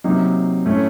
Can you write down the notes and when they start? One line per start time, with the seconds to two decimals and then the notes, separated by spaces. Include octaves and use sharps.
0.04 C3 F#3 A#3 D#4
0.65 A2 A3 C#4